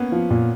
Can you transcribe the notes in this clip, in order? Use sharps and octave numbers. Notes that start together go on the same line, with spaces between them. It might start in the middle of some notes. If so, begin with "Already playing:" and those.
Already playing: A#3 B3 C#4
F3
A#2